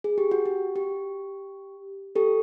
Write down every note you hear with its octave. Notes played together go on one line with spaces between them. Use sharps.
G#4
G4
F#4
G4
G4
G4 A4